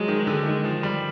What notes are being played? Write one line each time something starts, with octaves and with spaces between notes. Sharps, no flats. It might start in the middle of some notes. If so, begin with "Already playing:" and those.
Already playing: F3 F#3 G#3
D#3
D3
D#3 G#3
F3
G3